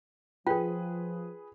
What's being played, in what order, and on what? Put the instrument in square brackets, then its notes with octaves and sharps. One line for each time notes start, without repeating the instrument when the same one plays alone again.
[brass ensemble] F3 [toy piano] F4 G5 [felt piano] G#4 B4